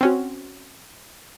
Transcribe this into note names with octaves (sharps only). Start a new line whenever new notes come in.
C4 C#4 F#4